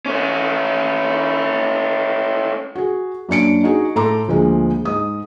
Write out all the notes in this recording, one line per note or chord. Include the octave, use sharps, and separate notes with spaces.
A3 C#4
F#4 G#4
F#2 A#3 D4 C#7 D7
D#4 F#4 G#4
A2 A4 A#5 C6 D6
D2 F3 G#3 A#3
G#2 D#6